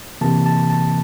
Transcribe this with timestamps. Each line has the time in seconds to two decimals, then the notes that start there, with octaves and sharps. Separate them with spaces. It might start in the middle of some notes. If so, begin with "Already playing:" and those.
0.21 C3 E3 A#3 A5
0.46 A5
0.70 A5